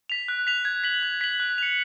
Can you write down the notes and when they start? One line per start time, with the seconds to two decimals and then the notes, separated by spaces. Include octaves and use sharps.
0.10 B6 F7
0.28 F#6
0.47 B6 F7
0.65 G#6
0.83 B6 F#7
1.03 G#6
1.21 B6 F#7
1.40 F#6
1.58 C#7 F7